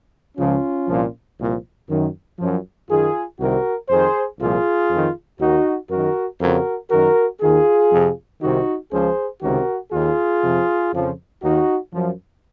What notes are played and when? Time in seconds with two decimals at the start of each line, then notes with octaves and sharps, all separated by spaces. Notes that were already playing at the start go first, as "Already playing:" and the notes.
0.38 C#2 C#3 F3 C#4 F4
0.88 C2 A#2 F3
1.39 C2 A#2 F3
1.89 F#2 D#3
2.39 F#2 F3
2.89 F#2 D#3 F4 G#4
3.39 C2 C3 D#3 F#4 A#4
3.89 F2 D#3 G#4 C5
4.40 C2 A#2 F3 F4 G#4
4.90 F2 D#3
5.40 D#2 D#3 D#4 F#4
5.90 F#2 D#3 F#4 A#4
6.40 F2 C#3 F3 F#4 A#4
6.91 F#2 D#3 F#4 A#4
7.40 D#2 D#3 F4 G#4
7.91 F2 C3 F3
8.41 C2 C3 D#3 D#4 F#4
8.91 C#2 C#3 F3 G#4 C5
9.42 C#2 C3 D#3 F#4 A#4
9.92 D#2 D#3 F4 G#4
10.43 F2 C3 F3
10.93 F2 C#3 F3
11.42 D#2 D#3 D#4 F#4
11.93 F#2 F3